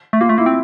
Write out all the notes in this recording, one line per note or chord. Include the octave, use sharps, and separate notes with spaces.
A3
A#3 F4
A3
A#3 E4
C4